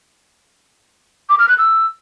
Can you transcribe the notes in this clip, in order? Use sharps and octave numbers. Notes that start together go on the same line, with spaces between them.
D6
F6
F#6
E6